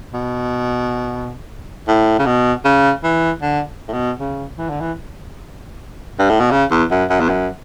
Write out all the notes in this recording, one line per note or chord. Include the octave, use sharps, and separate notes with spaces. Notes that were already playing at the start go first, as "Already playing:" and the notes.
B2
A2
C#3
B2
C#3
E3
D3
A2
B2
C#3
E3
D3
E3
G2
A2
B2
C#3
E2
F#2
F#2
E2
F#2